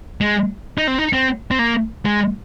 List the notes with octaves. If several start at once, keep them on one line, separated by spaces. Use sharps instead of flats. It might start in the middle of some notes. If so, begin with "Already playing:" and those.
G#3
D#4
C4
D#4
C4
C4
A#3
G#3